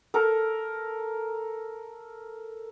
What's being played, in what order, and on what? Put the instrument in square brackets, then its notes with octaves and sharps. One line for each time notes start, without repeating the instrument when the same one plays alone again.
[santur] A4 A#4